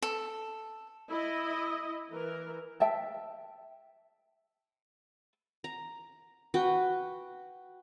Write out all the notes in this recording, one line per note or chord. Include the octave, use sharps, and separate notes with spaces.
A4
E4 D#5
E3 A#4
E5 G5 A5
A#5
F#4 B4 G5